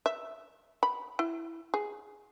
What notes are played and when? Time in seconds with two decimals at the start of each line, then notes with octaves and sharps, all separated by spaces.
0.06 E5
0.83 B5
1.19 E4
1.74 G#4